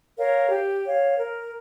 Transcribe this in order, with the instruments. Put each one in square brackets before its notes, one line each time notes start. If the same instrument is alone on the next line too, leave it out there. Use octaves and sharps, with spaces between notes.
[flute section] A#4 C#5 F5
G4
C#5 F5
A#4